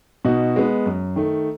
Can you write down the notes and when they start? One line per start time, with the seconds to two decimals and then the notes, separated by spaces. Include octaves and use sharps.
0.25 B2 D#4 F#4
0.56 G#3 B3
0.86 F#2
1.16 D#3 A3